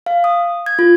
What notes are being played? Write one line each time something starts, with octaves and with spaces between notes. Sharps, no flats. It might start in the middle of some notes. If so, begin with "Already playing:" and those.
F5
D#6
G#6
F4